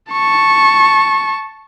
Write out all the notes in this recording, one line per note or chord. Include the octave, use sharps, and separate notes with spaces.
A5 C#6